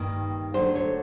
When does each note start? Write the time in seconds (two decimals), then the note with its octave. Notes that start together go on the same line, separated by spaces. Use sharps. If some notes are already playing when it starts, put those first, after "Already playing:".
Already playing: G2 D#3 G3 A#3
0.54 D2 D3 F#3 A3 C5
0.75 C#5